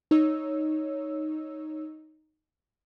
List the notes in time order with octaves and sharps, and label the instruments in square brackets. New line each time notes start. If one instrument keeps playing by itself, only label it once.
[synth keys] D#4 C#5 E6